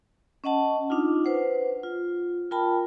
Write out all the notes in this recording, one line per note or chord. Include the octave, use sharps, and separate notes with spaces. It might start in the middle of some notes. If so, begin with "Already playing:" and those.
C#4 D#5 F#5 A5
D4 D#4 F4
B4 C5 F#5
F4
F4 A#4 G5 A5 B5